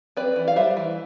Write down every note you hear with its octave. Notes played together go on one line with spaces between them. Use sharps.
C4 B4 D5
E3
F5
G3 C5 E5
E3